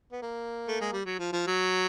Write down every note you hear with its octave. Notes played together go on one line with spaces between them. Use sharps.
B3
A#3
A3
G#3
G3
F#3
F3
F3
F#3